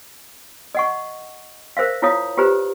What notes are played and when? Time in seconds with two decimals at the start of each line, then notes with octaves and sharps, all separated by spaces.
0.75 D#5 F#5 C#6
1.77 A#4 C5 E5 F5
2.02 E4 F4 C#5 F5 D#6
2.37 F4 G4 B4 C5 A#5